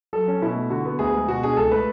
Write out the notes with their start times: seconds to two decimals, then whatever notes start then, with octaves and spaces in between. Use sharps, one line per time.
0.13 F#3 A4
0.28 C#4
0.42 B2 E4
0.56 A3
0.70 D3 F#4
0.85 B3
0.99 D2 G#4
1.14 G#3
1.28 B2 F#4
1.43 D4 G#4
1.57 C#2 A4
1.71 A3 B4